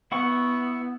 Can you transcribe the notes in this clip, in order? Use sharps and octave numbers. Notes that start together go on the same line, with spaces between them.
B3 E4 F#5 C#6